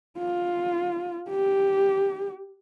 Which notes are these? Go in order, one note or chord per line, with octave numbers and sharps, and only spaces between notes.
F4
G4